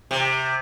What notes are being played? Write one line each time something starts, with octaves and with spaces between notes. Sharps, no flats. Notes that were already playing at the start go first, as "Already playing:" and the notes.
C3